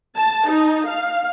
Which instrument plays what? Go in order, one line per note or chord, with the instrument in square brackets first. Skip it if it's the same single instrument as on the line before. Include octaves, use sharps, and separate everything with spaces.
[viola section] A5
D#4
F5